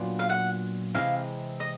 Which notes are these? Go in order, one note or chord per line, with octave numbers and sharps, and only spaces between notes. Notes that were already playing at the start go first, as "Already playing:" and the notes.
Already playing: A#2 F#3 B3 D4 F4
F5
F#5
C3 E3 G#3 C4 F5
D#5